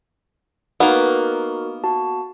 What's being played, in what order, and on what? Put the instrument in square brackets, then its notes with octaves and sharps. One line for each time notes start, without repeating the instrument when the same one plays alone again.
[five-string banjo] A#3 B3 [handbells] D#4 F#4 A#4
[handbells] F#4 A5